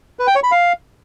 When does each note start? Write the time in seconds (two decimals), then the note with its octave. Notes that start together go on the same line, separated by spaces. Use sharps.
0.19 B4
0.27 G5
0.35 C#5
0.43 B5
0.51 F5